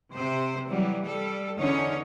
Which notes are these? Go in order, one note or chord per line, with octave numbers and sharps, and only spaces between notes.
C3 C5
E3 F#3 G3
G3 A4
E2 D3 C#4 D#4 C#5